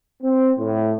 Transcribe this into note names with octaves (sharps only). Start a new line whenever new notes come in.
C4
A2